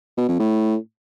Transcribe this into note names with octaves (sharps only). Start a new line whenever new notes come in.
B2
F2
A2